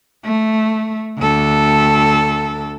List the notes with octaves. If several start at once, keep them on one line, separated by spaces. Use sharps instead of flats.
A3
D2 A4